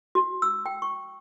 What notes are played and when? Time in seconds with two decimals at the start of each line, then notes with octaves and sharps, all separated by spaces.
0.15 F#4
0.42 E6
0.66 G5
0.82 C#6